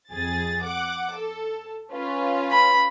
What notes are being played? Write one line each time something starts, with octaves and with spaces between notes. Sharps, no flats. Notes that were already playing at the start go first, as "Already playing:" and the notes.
F2 G#4 A6
F#5 D6
A4
C#4 F4 B4
B5